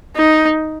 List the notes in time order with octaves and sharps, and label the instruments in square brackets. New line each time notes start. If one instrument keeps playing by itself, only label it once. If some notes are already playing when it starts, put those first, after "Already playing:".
[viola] D#4